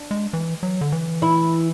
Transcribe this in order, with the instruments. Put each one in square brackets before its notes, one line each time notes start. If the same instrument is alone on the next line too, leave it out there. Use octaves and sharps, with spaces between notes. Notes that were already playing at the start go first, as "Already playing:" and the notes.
Already playing: [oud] D4
[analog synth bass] G#3
E3
F#3
D3
E3
[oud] E4